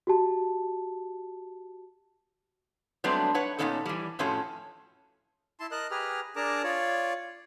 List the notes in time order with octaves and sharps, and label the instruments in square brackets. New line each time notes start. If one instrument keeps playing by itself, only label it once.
[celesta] F#4 G4 A5
[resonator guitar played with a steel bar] F#3 G3 A3 B3 C4 D4
B4 C#5 F#5
A#2 D3 B3 C#4 D#4 A4
E3 G3
F2 A2 F3 C#4 F#4 A4
[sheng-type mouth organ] E4 A5 C6
A#4 D#5 A5 F#6
G4 G#4 B4 A#5 F6
D4 G#4 A#4 A5 A#5 D6
F4 C#5 D5